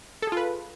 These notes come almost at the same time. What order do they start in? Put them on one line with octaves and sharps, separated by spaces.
A4 G#4 F4 B4